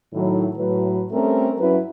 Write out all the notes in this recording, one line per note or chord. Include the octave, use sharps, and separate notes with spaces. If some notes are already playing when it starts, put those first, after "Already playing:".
A2 D#3 F#3
A2 F#3 B4
G3 A3 C4 C#4 A4 A#4
G2 F#3 C#4 E4 B4